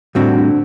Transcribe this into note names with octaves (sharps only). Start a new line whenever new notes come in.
A2 D3 G3 C4 F#4
D3